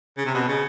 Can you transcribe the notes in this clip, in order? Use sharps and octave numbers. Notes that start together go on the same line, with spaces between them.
C#3
C3
B2
C#3